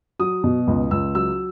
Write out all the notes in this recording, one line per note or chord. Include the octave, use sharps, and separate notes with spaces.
F#3 D#6
B2
C#2
C#2 E6
F#3 E6